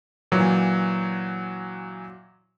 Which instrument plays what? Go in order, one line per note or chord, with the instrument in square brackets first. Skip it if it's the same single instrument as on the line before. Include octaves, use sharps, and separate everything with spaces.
[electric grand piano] A#2 E3 F#3